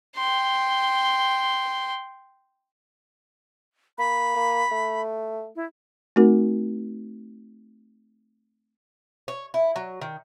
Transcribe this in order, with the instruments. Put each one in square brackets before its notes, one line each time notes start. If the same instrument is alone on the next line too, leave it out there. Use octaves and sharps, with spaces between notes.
[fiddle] G5 C6
[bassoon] A#3 [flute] B5
[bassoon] A#3
A3
[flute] E4
[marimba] A3 C4 D#4 F#4 A#4 F#5
[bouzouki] C#5
E4
F#3
D#3